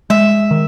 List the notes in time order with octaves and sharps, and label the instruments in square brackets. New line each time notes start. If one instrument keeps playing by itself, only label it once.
[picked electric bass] G#3 [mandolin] E5
[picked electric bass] D#3